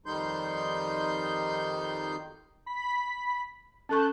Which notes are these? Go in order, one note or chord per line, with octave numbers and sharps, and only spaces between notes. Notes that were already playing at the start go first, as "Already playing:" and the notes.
F2 D#3 G3 D#4 C6 G6
B5 B6
C#4 A4 A5 C#6 F#6 G6